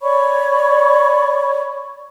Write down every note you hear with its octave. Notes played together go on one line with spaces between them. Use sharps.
C#5 D5 B5 C#6